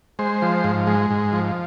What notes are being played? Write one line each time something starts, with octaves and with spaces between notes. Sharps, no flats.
G#3 C5
F3
G#2
G#3
G#2
F3